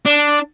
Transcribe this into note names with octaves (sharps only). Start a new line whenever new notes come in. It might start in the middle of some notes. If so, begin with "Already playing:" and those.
D4